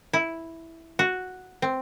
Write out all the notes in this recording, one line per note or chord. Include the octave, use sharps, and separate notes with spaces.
E4
F#4
C4